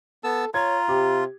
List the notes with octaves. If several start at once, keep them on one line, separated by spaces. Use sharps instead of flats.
B3 A4 A5 E6
F4 C#5 A#5 G#6
C3 G4